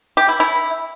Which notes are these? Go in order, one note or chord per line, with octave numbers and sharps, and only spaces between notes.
G4
E4
E4